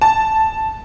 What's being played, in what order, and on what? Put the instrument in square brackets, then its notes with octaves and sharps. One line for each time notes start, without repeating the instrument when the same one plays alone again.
[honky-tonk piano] A5